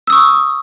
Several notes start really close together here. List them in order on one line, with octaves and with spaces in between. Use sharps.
E6 D#6 C#6